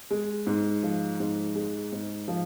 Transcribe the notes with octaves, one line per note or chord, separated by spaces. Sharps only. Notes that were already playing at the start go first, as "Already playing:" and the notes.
G#3
G#2
F3
G#2
G#3
G#2
F3